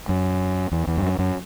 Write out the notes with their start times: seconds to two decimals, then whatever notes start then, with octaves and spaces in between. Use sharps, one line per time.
0.09 F#2
0.72 E2
0.87 E2
0.97 G2
1.03 F#2
1.19 F#2